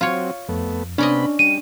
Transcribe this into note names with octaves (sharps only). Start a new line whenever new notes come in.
F#3 C4 F4 C#5
F2 A3 B3
C3 B3 C#4 D4 D5 D#5 B5
G3 D#7